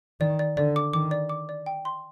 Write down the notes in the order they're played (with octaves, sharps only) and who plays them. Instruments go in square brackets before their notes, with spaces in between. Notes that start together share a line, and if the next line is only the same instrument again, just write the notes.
[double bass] D#3 [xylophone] D5
[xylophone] D5
[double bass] D3 [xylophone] D5
[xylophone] D6
[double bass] D#3 [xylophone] D6
[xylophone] D5
D6
D5
G5
C6